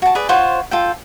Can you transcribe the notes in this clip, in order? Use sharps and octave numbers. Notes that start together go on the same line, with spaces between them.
F#4 A5
G#4 B4 D5
F4 C5 C#5 F#5
F4 A4 G5